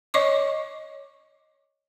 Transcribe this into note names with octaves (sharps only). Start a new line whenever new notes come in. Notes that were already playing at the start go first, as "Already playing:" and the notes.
C#5 D#5 C#6 D6